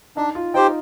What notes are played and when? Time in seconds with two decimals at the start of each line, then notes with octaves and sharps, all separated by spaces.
0.17 D4 D#4
0.35 F4
0.54 D#4 G4 C5 G5